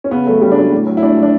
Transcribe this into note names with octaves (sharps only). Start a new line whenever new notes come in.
C#4
C#3 B3
F#3 A3
C#3 G3
F#3 D4
A2
F#3
E4
A2 D4
F#3
D4